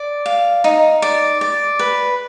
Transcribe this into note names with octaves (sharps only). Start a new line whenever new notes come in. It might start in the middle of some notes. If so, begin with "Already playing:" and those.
Already playing: D5
F5
D#4
D5
D5
B4